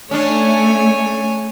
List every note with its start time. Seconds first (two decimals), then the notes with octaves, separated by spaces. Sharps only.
0.11 A3 C#4 D4 C#5 G#5